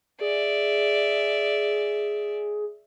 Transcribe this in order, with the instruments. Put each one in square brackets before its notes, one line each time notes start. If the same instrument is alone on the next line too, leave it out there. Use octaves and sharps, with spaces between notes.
[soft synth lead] G#4 [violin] D5 E5